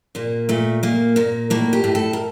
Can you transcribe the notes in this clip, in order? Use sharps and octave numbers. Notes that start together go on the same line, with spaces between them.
A#2 A#3
A#2 A3
A#2 A#3
A#2 A#3
A2 A#3
G4
A2
A4
A#4